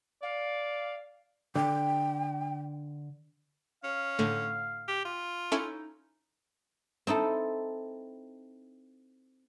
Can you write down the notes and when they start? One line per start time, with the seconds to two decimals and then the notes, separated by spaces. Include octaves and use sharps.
0.22 D5 F5
1.56 D3 G5
3.84 C#4 F5
4.19 A2 D3 A3
4.88 G4
5.05 F4
5.52 C#4 D#4 E4 A4
7.07 C4 D#4 E4 A4